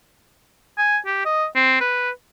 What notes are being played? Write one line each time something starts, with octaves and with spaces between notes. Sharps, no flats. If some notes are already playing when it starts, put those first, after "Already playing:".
G#5
G4
D#5
C4
B4